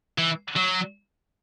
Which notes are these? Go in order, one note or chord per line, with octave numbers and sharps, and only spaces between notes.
E3
F#3